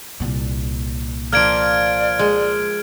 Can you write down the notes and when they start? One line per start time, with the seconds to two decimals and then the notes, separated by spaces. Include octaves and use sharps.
0.20 C2 A#2
1.33 F3 A#3 D5 F6 G#6 D7
2.19 G#3